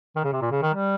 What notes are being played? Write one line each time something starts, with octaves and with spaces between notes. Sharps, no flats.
D#3
C#3
C3
A#2
C#3
D#3
G3